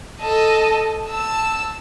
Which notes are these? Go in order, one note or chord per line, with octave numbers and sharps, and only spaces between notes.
A4 D#5
A5 E6